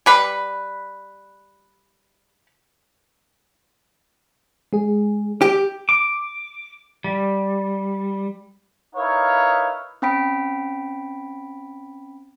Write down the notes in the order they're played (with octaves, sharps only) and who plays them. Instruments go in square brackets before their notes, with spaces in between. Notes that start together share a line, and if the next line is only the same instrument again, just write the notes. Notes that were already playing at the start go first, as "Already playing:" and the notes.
[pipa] G3 B4 B5
[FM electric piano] G#3 G#4
[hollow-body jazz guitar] G4
[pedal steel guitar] D6
G3
[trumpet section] D#4 E4 A#4 B4 C#5 F5
[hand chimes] C4 C#4 G5 B5 B6 D7